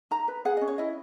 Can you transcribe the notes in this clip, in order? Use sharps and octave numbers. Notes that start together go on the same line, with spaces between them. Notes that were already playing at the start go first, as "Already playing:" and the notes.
D#4 A#5
B4
G#4 F#5
C#4 D#5
C#5
E4 D#5